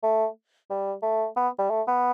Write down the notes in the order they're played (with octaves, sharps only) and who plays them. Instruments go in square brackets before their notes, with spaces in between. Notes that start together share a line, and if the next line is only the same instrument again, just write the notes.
[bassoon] A3
G3
A3
B3
G3
A3
B3